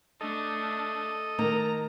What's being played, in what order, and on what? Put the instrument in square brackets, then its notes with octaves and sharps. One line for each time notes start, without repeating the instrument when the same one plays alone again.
[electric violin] A3 D4 [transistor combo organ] A4 D#5
[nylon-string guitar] D#3 [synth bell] A3 [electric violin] A#5